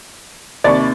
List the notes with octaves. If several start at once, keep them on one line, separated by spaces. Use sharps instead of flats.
D#2 C3 D5 B5 C#6 A6